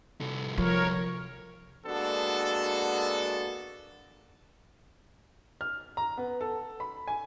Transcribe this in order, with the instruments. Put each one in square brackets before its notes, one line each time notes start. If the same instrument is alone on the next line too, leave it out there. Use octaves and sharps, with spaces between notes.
[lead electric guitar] C2 A4
[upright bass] F3 [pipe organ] A#4 C#5
[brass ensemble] G#3 A#3 B3 D4 F#4 A4
[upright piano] F6
A#5
B3
A4
B5
G#5